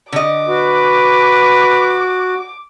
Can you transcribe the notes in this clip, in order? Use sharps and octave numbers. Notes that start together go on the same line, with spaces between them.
D3 D#5 D6
F#4 B4